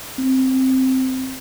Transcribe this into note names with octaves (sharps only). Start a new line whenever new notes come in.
C4